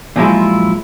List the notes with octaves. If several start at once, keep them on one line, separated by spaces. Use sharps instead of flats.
A#2 F3 F#3 G#3 E4 F4